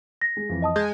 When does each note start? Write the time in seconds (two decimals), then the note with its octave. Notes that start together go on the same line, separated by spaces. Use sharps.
0.22 A#6
0.37 G#3
0.49 F2 E3
0.62 D#5 A5 D#6
0.76 G#3 G6